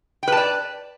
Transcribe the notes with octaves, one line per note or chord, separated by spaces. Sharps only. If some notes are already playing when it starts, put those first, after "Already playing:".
B4 D5 G5 A5